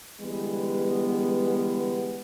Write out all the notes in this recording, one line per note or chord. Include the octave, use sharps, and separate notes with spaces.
D3 E3 G3 G#3 B3